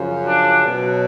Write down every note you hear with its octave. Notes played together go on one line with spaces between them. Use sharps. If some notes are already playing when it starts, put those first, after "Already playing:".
Already playing: F#2 C#3 F3
D4
B2 F#3